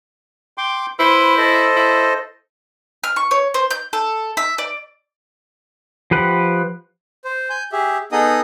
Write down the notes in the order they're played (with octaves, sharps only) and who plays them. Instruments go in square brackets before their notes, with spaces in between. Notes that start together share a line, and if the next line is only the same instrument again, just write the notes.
[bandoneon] G5 C6 D6
[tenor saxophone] E4 [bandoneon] B4 C5 C6
[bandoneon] A4 C5 D#5
[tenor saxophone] E4
[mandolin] F6
C#6
C#5
C5
G6
A4
E5
D5
[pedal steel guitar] F3 G4 B4 F#5
[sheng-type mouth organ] C5
G#5 G6
G4 G#4 E5
B3 D#4 G#4 A4 D#5 D#6